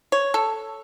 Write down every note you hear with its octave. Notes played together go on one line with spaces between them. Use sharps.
C#5
A4